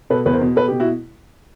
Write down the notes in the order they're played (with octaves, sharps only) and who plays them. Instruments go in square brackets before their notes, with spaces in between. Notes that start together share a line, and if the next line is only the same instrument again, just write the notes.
[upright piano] B2 A4 B4
E2 B4
A#4 C5
B2
B2 A4 B4
B2 G4
E4 F#4